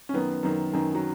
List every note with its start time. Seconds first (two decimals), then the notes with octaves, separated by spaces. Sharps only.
0.09 C#4
0.13 F#2 D#3 B3
0.43 F#2 D#3
0.73 F#2 D#3
0.95 F#3